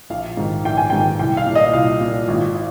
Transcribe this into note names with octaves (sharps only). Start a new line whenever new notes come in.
A#1 F5
G#2 D#3
A#1 G5
G#5
G#2 D#3 G5
C2 G5
F5
A#2
D#5
C2 F5
A#2
G#1